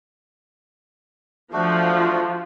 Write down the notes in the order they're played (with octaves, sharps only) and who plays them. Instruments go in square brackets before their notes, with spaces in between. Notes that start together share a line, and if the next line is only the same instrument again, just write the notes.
[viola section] F3 [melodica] A3 D4 F#4